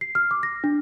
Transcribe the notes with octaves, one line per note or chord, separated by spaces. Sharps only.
C7
F6
D6
A#6
D4